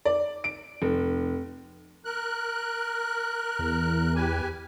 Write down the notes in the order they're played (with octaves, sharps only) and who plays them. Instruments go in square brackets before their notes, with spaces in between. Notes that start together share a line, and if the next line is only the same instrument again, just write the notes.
[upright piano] D5
D7
F1
[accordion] A#4 F#6
[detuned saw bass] E2
[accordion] G4 B4 G#5